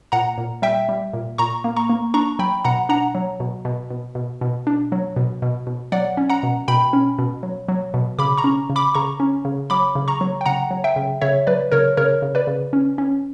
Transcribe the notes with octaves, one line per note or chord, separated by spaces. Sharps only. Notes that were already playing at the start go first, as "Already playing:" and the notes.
A#2 F#5 A#5
A#2
G3 E5 G5
G3
A#2
A#2 A#5 C#6
A#3
A#5 C#6
A#3
D4 A#5 C#6
F#3 G5 B5
B2 F#5 A#5
D4 F#5 A#5
F#3
B2
B2
B2
B2
B2
D4
F#3
B2
B2
B2
F#3 D5 F#5
C#4
F#5 A#5
B2
B2 G5 B5
C#4
B2
F#3
F#3
B2
C#3 B5 D6
A#5 C#6
C#4
C#3
B5 D6
C#3 A#5 C#6
C#4
C#3
F#3 B5 D6
C#3
A#5 C#6
F#3
G5
C#3 F#5 A#5
F#3
E5 G5
C#3
C#3 C#5 E5
F#3 B4 D5
C#3 A#4 C#5
C#3 A#4 C#5
C#3
B4 D5
C#3
C#4
C#4